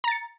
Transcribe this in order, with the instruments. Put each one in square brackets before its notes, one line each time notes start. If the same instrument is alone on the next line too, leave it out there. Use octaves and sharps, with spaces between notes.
[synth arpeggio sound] A#5
A6
C#7